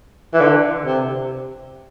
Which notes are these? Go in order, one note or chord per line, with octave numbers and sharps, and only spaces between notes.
E3
D3
C3